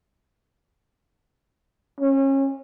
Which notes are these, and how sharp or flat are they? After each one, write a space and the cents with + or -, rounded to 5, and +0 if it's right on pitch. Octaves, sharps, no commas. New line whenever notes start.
C#4 -30